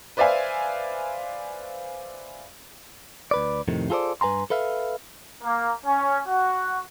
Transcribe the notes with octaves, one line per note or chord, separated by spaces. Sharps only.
B4 C5 D5 E5 F5 G#5
D2 B4 D5
F2 A2 C3 D#3
F4 G#4 A4 B4 C5 D5
G2 B4 G#5 A#5 C6
A4 B4 E5 F5
A#3
C#4
F#4